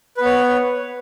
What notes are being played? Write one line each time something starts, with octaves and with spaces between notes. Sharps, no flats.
B3 B4 C#5